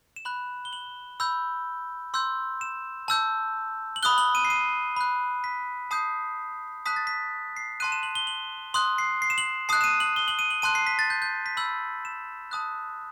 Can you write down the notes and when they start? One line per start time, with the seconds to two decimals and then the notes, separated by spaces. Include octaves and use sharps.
0.16 E7
0.25 B5 F#6 F#7
0.65 G7
0.73 F#7
1.20 B5 E6 G6
2.14 C6 E6 G6
2.61 E7
3.08 A5 E6 G6
3.96 F#7
4.03 B5 D#6 F#6 G7
4.18 F#7
4.35 D#7
4.45 C7
4.50 D#7
4.97 B5 F#6
5.44 B6
5.91 A5 D#6 G6 C7
6.86 A5 D#6 F#6 B6
6.96 A6
7.07 B6
7.57 C7
7.80 A5 C6 F#6 D#7
7.92 E7
8.03 F#7
8.15 G7
8.27 F#7
8.74 C6 D#6 F#6 F#7
8.98 C7
9.22 C7
9.30 E7
9.38 F#7
9.69 A5 D#6 F#6 C7
9.81 E7
9.84 D#7
10.00 F#7
10.16 G7
10.28 F#7
10.39 D#7
10.50 F#7
10.62 A5 C6 F#6 D#7
10.75 C7
10.87 B6
10.99 A6
11.10 G6
11.22 G6
11.46 B6
11.57 B5 E6 G6 F#7
12.05 E7
12.51 A5 D#6 F#6